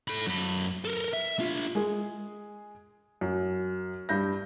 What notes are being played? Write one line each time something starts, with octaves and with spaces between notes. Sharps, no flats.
A4 B5
F#2 B5
A4 A#4
E5
D4 F4
G#3 G#4
F#2
G2 G6 A#6